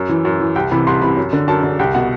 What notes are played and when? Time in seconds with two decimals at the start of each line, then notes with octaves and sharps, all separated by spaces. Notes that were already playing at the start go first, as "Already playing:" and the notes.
Already playing: F#2
0.09 E3
0.25 F#2
0.39 E3
0.56 C2 G5
0.71 C3 E3 B5
0.87 C2 C6
1.02 C3 E3 B5
1.17 F#2
1.33 D3
1.48 F#2 A5
1.63 D3
1.79 C2 G5
1.95 B2 F#5